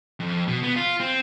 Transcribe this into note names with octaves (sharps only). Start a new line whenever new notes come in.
F2
B2
B3
F4
C4